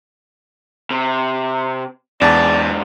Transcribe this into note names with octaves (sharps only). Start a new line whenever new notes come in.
C3
E2 G#2 D4 D5 A5